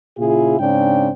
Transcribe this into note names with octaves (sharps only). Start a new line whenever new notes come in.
A#2 C#3 E4 F4 G#4
G#2 C#3 C4 D4 G5